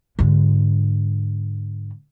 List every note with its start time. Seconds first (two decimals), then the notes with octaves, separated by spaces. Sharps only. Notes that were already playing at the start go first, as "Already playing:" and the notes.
0.19 G#2 D3